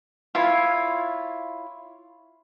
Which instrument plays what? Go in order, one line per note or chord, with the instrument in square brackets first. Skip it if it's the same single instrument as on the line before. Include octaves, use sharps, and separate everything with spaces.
[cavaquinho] E4 F4 C#5